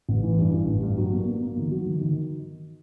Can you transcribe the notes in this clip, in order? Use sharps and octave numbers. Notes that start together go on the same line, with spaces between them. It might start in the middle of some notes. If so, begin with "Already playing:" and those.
A1
E3
G2
G2
A1
G2
F#3
A#3
A#3
A#3
D#3
F#3
D#3
D#3